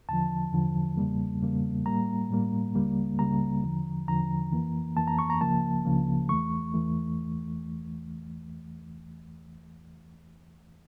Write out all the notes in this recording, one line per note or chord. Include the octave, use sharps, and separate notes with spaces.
E2 D3 F3 A5
E2 D3 F3
E2 C#3 G3 A#3
E2 C#3 G3 A#3
A2 G3 A#3 A#5
A2 G3 A#3
C#2 C#3 G3 A#3
C#2 C#3 G3 A#3 A#5
E2 D3 F3
E2 D3 F3 A#5
F2 E3 A#3
F2 E3 A#3 A5
A#5
C#6
A#5
C#2 C#3 F3 A#3 A5
C#2 C#3 F3 A#3
E2 E3 A3 C#6
E2 E3 A3